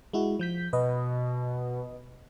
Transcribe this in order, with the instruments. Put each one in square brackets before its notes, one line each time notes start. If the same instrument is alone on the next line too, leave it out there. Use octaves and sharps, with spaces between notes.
[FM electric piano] G#3 E4 F#4
F3 G6 B6
[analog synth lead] B2 [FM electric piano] B4 D#5